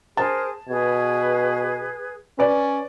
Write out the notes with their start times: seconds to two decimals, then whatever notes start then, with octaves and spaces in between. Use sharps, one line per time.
0.17 G#4 A#4 C5 A5
0.69 B2 G#4 B4 G#6
2.39 C#4 B4 D5